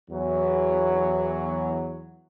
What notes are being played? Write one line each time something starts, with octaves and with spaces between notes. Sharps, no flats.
E2 F#3